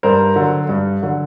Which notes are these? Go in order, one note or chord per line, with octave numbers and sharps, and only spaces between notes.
G2 A#4 C5
D3 F#3
G2
D3 F#3